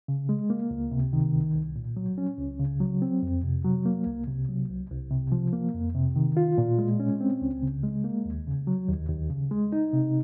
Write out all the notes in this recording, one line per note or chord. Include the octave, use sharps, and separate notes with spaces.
C#3
G#3
A#3
C#2
C3
D#3
C2
C2
A#2
F#3
C#4
C#2
C#3
F#3
C4
F2
C3
F#3
A#3
C2
C3
F#3
C2
C2
C3
F3
A#3
F2
C3
D#3
F4
A#2
G#3
C#4
C4
C#2
C#3
G#3
A#3
D#2
C#3
F#3
D#2
D#2
C#3
G#3
D#4
C3